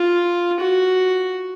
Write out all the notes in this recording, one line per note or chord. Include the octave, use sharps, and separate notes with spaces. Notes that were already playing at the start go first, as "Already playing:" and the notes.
Already playing: F4
F#4